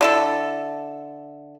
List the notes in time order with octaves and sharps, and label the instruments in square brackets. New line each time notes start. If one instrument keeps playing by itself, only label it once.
[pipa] D3 E4 A4